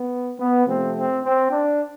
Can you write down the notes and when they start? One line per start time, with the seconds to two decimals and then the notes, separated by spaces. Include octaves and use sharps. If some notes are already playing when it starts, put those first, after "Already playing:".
Already playing: B3
0.38 B3
0.66 C3 F3 A3 C4
0.95 C4
1.23 C4
1.51 D4